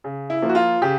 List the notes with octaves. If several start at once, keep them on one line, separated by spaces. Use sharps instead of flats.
C#3
E4
F3 A#3
F#4
F4
C#3 G4